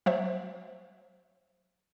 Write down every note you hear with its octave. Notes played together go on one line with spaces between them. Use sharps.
F#3 C5 E5